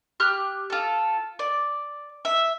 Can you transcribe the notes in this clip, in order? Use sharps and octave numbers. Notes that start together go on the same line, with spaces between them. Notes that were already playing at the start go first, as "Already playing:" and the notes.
G4 F6 F#6
F4 A4
D5
E5